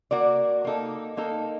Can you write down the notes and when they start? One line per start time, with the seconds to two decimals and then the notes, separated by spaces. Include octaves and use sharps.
0.11 A#3 F#4 A#4 D5
0.65 A#3 D#4 A4
1.17 A#3 D#4 A4